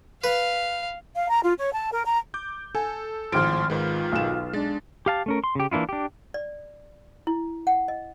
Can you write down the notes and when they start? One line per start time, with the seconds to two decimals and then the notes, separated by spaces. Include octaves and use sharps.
0.24 B4 F5
1.15 F5
1.31 A#5
1.43 F4
1.58 C#5
1.72 A5
1.91 A#4
2.06 A#5
2.34 D6 G6
2.75 A4 G#5
3.32 G#1 A2 F3 G#3 C6 F6 D7
3.70 G#2 D#3 G#3 F4 B4
4.12 B1 E7
4.53 G#3 D4 A6
5.06 G4 F5 A5
5.26 A3 C#4 A#4
5.44 C6
5.55 C#3 G4
5.71 E3 A#3 D4 E4 F4
5.89 D4 G4
6.34 D5
7.27 E4
7.67 F#5
7.88 D#5